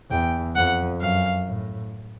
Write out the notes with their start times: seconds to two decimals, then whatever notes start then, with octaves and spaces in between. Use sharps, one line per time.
0.11 E2 G5
0.56 F2 F#5
1.01 F#2 F5
1.46 A2